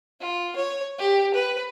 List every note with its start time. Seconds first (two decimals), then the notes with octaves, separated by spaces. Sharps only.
0.20 F4
0.56 C#5
0.99 G4
1.34 B4